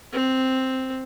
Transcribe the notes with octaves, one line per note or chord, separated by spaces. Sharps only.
C4